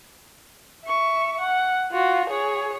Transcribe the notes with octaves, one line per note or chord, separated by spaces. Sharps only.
E5 C#6
F#5
F4 F#4
G#4 C#5